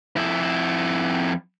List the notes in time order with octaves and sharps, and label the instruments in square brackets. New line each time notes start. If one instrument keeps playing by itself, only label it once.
[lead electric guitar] F2 E4